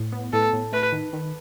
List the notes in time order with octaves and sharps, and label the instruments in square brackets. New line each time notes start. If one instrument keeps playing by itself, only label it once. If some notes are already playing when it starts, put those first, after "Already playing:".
Already playing: [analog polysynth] A2
B3
[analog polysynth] A2 [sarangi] A4
[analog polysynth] A2
[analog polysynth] A3 [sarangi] B4
[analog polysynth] D#3
D#3